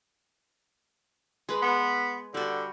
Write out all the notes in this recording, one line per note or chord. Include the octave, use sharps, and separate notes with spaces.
G#3 B4
B3
D3 G3 F#4